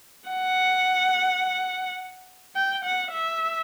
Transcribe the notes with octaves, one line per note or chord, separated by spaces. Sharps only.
F#5
G5
F#5
E5